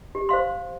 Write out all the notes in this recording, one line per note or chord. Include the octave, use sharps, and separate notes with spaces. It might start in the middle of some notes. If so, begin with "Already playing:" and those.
G4
C5 F5 C6